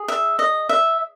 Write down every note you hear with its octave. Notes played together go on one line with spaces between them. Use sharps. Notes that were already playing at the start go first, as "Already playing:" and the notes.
Already playing: G#4
E5
D#5
E5